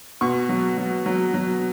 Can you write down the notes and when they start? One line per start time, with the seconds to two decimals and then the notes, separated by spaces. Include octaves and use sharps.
0.21 B2 C#6
0.49 F#3
0.77 F#3
1.06 F#3
1.34 F#3